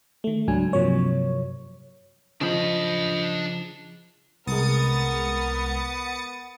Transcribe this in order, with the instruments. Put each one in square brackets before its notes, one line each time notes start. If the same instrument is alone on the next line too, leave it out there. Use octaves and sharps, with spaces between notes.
[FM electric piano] D#3 A3
C#2 G#2 F#3 D4 G#5
G2 C3 F3 F#3 A#3 C#5
[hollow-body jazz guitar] C#3 F3 [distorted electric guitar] D4 B5 [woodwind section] D#5
[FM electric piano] C2 G#3 [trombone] B3 [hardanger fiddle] A#4 [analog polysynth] D#6 A6 C#7